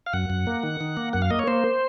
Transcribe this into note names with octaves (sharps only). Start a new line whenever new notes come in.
F5
F#2 F#5
F#2
A#3
D#3
D#3
A#3
F#2 F#5
F5
A#3 D#5
C#5
A#3 C5